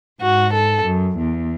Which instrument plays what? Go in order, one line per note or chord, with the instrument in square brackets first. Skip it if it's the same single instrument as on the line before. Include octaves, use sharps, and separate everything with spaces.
[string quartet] G#2 [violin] F#4
[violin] A4
[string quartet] F#2
E2